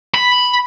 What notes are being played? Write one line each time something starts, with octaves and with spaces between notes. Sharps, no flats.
B5